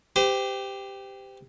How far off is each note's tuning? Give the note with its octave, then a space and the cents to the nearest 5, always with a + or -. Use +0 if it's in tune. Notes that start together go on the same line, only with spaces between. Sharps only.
G4 +5 C5 -35